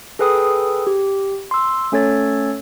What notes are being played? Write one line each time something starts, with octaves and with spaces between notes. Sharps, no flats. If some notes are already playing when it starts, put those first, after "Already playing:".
G#4 A4 B4 G5 D#6
G4
C6 E6
A3 C#4 A4 C#5 A6